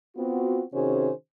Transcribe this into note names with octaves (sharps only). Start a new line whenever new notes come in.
B3 C4 F4 F#4
C3 D#3 C#4 F#4 G#4 C5